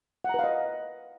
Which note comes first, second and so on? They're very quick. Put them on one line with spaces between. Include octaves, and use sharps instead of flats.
F#5 A#5 B4 F5 D#5